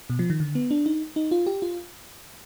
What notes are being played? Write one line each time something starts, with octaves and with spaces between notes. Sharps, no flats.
B2
F3
D#3
D3
B3
D4
D#4
D#4
F4
G4
F4